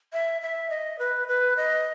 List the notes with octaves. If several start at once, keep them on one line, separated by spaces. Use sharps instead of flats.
E5
E5
D#5
B4
B4
D#5